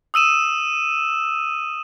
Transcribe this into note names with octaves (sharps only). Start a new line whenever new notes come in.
D#6 E6 D#7 E7